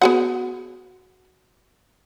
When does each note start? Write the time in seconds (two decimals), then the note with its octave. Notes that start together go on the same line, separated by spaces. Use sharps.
0.02 B3 F#4 G#4 F#5